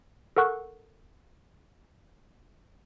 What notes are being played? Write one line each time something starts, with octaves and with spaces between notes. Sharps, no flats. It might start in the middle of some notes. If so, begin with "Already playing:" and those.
A4 A#4 F#5 C#6 F#6